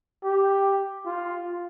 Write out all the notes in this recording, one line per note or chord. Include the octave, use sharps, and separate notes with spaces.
G4
F4